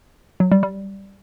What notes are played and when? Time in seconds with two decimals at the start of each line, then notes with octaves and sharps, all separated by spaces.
0.40 F#3
0.52 G3
0.63 G3